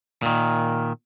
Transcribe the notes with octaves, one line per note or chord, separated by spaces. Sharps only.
A#2 D#3